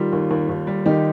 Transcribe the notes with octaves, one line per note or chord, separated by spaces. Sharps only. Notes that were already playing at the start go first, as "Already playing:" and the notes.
Already playing: D#3 G3 F4
D#2
D#2
D#2
G3
D#3 D#4 G4